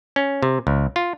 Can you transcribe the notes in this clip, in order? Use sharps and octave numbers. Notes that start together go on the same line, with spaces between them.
C#4
C3
C#2
F4